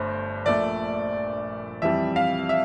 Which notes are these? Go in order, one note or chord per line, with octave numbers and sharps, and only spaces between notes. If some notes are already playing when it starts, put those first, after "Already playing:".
Already playing: G1 G2 A3 C5
A#1 A#2 A3 D5
F2 E3 G3 E5
F5
E5